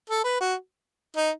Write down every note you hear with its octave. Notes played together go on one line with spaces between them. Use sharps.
A4
B4
F#4
D#4